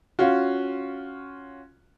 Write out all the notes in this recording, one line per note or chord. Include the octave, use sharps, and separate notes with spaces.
C#4 F4 F#4